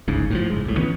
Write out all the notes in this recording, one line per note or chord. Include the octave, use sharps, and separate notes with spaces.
G1 C#2 G#2 C#3
A2 D3 F3
F#1 G#2 G#3
C2 A2
D#3 E3 B3 C#4